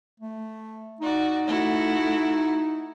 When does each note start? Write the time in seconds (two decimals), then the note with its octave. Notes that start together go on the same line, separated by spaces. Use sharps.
0.20 A3
1.01 D#4 F#4 D5
1.46 A3 E4 F#4